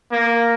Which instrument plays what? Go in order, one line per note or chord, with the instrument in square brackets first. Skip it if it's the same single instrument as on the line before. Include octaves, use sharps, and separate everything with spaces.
[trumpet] A#3